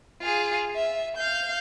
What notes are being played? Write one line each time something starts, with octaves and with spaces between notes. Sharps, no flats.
F4 G#4
E5
F5 G6